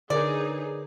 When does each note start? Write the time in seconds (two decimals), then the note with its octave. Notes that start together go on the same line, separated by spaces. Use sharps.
0.10 D3 D#4 G#4 A#4 B4 C#5 D5